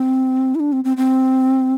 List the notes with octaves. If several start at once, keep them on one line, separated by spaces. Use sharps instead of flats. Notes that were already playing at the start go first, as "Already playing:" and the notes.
Already playing: C4
E4
D4
C4
C4
C4